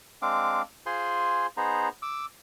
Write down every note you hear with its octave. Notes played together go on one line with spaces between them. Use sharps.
G#3 C4 D4 F5 D6
F4 G#4 C5 G#5 C6
B3 D#4 G#4 C5 A#5
D6 E6